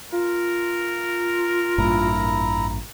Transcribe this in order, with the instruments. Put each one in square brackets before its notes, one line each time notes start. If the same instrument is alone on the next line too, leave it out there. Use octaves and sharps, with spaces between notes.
[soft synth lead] F4 [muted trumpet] A#4
[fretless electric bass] A1 G2 A#2 [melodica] E4 A#5